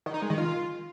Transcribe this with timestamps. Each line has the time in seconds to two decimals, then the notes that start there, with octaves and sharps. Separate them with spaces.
0.06 D#3
0.14 D#4
0.22 G#3
0.30 D#3
0.38 F4